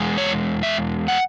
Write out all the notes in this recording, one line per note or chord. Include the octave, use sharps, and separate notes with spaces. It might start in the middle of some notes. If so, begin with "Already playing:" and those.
Already playing: E2 G#3
C#5
E5
F#5